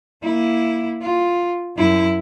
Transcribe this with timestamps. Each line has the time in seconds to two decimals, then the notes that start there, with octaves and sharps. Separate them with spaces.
0.24 A#3 E4
1.02 F4
1.78 F#2 E4